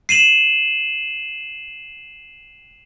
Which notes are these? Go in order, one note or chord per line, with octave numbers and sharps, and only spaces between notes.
C7 D#7 E7 F#7